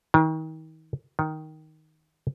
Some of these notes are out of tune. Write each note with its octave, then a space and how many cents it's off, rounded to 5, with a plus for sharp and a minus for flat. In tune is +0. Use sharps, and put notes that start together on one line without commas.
D#3 +35
D#3 +5